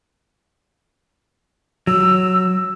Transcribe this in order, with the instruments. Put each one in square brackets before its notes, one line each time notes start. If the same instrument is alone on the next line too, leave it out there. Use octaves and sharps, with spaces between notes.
[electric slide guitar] F#3 [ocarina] E6